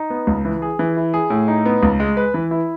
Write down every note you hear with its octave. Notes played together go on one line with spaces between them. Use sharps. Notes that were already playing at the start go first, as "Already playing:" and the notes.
Already playing: D#4
B3
C#2
E3
G#4
E3
E4
G#4
A2
D#4
B3
C#2
G#3
B4
E3
E4